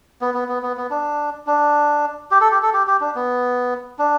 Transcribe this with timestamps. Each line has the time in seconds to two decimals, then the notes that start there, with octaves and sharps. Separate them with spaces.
0.21 B3
0.34 B3
0.49 B3
0.63 B3
0.77 B3
0.91 D4
1.47 D4
2.31 G4
2.41 A4
2.51 G4
2.62 A4
2.73 G4
2.87 G4
3.01 D4
3.15 B3
3.99 D4